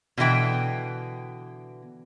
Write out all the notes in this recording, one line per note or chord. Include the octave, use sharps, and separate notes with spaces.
B2 D3 E3 G5